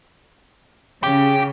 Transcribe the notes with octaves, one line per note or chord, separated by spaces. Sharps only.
C#3 G4